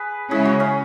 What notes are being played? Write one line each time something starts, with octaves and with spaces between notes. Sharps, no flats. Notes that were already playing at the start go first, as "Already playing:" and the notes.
Already playing: G#4 B4
C#3 G#3 C#4 E4 G#4
F#4
C#4